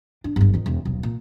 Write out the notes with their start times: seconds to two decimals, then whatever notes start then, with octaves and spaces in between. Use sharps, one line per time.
0.24 D4
0.36 G1 G2
0.54 F2 D#3
0.66 E1
0.85 D#1 B1
1.03 A#2